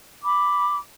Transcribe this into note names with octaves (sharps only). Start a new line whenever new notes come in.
B5 D6